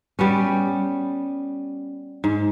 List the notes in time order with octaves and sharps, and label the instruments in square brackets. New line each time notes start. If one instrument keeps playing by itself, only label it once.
[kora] G3 B3 C#4
G#2